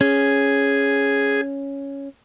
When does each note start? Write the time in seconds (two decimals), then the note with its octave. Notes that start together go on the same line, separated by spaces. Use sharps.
0.01 C#4 G#4